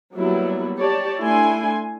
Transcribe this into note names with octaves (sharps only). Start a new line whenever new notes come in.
F#3 G3 A#3 B3 E4
G4 C#5 D5 A5
A3 D4 E4 G#5 C6